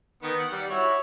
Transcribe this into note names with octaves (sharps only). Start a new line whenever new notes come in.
D#3 B3
F#5
G3
E4 F#4 C#5